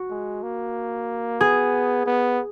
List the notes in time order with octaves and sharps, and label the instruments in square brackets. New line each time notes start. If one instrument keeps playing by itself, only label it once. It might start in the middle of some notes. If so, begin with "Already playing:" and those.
Already playing: [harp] F#4
[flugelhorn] G#3
A#3
[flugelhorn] B3 [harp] G#4
[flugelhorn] B3